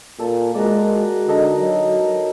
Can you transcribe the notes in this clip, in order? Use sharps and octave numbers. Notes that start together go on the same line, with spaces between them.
A#2 A4
G#3 F#4 A#4 D5
D3 D#4 A4 A#4
F#3